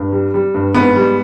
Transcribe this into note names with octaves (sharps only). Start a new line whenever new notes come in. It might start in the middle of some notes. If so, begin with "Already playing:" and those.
Already playing: G2
G3
G3
G2
G#2 B3
G3